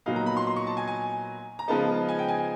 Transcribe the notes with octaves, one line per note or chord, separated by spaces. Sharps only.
A#2 F#3 B3 D#4 F5
A#5
B5
C6
C6
C#6
A5
G#5
G#5
A#5
C#3 F3 G#3 B3 D#4 A5
G#5
G5
G#5
G#5